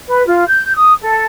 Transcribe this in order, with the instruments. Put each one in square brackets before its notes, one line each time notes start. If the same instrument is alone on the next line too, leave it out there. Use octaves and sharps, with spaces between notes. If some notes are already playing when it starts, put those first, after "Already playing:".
[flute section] B4
F4
G6
D#6
A4